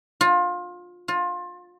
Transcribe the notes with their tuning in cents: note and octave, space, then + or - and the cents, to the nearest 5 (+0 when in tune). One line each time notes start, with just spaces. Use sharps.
F4 +25
F4 +25